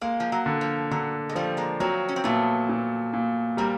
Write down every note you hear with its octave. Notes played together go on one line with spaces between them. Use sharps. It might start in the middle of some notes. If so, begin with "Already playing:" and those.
G#3 A#3
F3
F#3
D3
F3
D3 F#3
G#3
F3 G3 A3
G#3 A#3
F#3 A#3 C4
C#4
C4
A#2 A3 B3
A#2
A#2
G3 A#3 C4